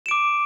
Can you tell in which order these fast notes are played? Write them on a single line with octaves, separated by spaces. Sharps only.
E7 D7 D6